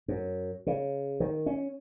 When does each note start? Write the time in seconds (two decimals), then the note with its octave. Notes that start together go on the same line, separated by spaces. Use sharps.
0.08 F#2
0.67 C#3
1.20 D#3
1.46 C#4